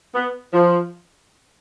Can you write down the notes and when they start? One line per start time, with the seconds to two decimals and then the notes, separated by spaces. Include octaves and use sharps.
0.14 B3
0.53 F3